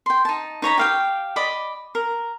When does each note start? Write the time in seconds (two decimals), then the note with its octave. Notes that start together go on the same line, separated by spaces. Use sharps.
0.06 G5 C6
0.25 D#4 A5
0.62 D#4 C#5 A#5 B5
0.78 G4 F5 G5
1.36 D5 D#5 B5
1.95 A#4